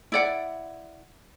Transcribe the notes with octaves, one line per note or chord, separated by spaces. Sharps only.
E4 D5 F#5